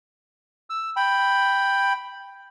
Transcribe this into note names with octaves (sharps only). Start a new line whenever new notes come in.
E6
G5 B5